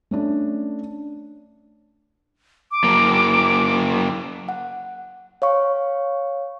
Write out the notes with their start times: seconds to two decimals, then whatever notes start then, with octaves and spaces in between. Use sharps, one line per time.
0.11 A3 C#4 D4
2.71 D6
2.84 F#2 A#3
4.49 F#5
5.42 C#5 F5 C#6